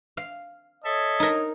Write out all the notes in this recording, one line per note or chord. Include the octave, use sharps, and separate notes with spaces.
F5
A4 C#5 D#5 E5
D#4 A#4